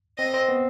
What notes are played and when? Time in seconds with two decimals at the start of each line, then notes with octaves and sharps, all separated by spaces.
0.18 C4 D#5
0.34 C4
0.49 B3